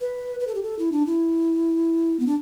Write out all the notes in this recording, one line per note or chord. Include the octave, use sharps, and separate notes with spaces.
B4
B4
A4
G4
A4
E4
D4
E4
B3
D4